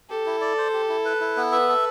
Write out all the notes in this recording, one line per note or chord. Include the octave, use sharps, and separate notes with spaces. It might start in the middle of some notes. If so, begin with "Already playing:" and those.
G4 A4
E4
D5
C5
G4
E4
B4
E4
B3
B4 E5
A4